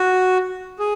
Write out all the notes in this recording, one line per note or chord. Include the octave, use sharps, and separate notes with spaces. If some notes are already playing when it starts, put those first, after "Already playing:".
Already playing: F#4
G#4